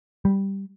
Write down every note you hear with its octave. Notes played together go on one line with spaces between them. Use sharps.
G3